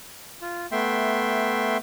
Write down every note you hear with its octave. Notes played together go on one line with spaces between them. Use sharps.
F4
A3 B3 E5 G5 C6